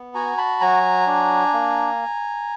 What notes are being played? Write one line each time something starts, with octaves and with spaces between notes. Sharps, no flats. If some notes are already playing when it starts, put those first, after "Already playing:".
Already playing: B3
F#4 G#5 A#5
A5 B5
F#3 G#5 A#5
D4
A#3